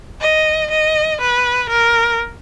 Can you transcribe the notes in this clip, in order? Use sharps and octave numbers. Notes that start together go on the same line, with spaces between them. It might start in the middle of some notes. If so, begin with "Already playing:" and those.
D#5
D#5
B4
A#4